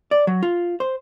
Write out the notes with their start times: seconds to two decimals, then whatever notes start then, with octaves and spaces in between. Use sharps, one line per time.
0.11 D5
0.27 F#3
0.43 F4
0.80 C5